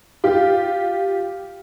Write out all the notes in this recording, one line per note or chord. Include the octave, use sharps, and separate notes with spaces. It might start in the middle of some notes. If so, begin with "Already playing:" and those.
F4 G4